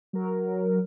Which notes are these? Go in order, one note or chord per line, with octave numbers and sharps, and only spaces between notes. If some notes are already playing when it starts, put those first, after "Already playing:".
F#3 A#4